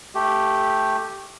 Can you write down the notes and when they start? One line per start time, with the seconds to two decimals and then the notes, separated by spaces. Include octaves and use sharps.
0.15 A3 G4